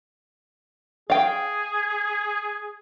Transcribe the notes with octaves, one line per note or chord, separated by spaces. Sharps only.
G#4 F5 G5